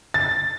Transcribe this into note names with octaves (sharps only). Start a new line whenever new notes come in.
A6